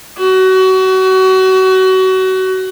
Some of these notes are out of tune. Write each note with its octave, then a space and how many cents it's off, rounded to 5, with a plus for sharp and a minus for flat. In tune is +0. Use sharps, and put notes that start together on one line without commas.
F#4 +30